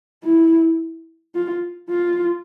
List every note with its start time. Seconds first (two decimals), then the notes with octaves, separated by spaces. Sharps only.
0.23 E4
1.35 F4
1.90 F4